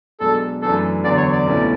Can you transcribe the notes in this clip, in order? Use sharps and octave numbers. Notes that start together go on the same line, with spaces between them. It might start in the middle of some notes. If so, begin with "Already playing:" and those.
B1 B2 G#3 D4 A4
F#2 E3 A3 D4 A4
E2 D3 F#3 D5
C#5
D5
C#2 B2 A3 C#4 E4